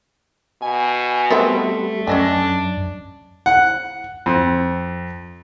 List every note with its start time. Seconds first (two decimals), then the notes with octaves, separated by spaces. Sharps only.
0.62 B2 G#5
1.30 G3 A3 B3 C4 E5
2.07 F#2 C#4 D4 D#5 G#5
3.46 F#5
4.26 F2